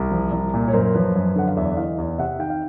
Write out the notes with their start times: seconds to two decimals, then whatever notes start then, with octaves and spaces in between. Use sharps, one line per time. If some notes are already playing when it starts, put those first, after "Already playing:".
Already playing: C2
0.11 F3
0.32 C2
0.54 A#2
0.68 C#5
0.73 F#2 A#4 C5
0.94 F3 B4 C#5
1.16 F#2
1.36 D3 F#5
1.48 F5
1.57 E2 D5 E5
1.77 E3 D#5 F5
1.98 E2
2.18 C3 E5 F#5
2.39 D#3 F5 G5
2.50 F5